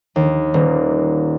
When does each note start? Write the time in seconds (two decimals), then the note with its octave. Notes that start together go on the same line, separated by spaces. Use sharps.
0.16 D#2
0.54 D#1